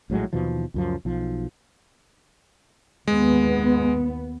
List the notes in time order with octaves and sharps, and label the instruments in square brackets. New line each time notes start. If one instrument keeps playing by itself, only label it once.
[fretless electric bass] A#1 A2 F#3 G#3
D#2 B2 E3 F3
C#2 F#2 F3
B1 F3
[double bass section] D#2 B3 [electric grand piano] G#3